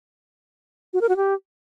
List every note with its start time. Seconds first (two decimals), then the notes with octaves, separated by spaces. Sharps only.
0.93 F#4
1.01 A#4
1.09 F#4
1.17 G4